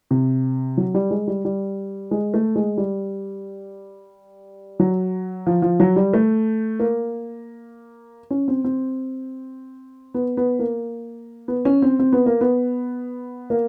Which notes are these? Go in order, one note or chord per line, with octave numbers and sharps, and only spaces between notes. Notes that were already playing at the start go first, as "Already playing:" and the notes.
C3
F#3
G3
G#3
G3
G3
G#3
A3
G#3
G3
F#3
F3
F3
F#3
G3
A3
A#3
C#4
C4
C4
B3
B3
A#3
B3
C#4
C4
C4
B3
A#3
B3
A#3